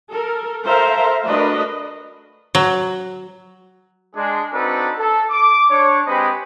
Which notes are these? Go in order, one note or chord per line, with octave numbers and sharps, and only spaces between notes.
A4 A#4
A4 A#4 C5 E5 F5 A#5
A3 D4 F#4 A#4 B4 D#5
F#3
G#3 D4 G#4
C4 D4 D#4 F#4 A4 B4
A4
D6
D4 C#5
G#3 C4 G4 B4 D#5 B5